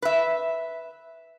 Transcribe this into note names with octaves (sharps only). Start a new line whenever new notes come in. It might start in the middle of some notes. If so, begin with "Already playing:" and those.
B4 E5